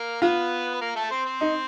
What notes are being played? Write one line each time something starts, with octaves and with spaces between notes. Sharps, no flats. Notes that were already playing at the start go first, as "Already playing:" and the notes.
Already playing: A#3 A#4
B3 F4 B4
B4
A#3 A#4
A3 A4
C4 C5
C4 C5
D#4